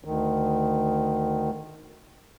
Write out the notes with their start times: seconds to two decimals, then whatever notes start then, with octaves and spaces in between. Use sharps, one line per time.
0.05 D2 D#3